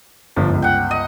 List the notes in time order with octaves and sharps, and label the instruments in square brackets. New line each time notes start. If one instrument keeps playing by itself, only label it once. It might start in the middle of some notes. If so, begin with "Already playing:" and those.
[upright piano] G1 D3 F3
G1 C#2
[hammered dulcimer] F#5 G5
D#5